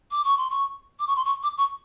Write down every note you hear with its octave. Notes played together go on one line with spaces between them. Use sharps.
D6
C#6
C6
C#6
D6
C#6
C6
C#6
D6
C#6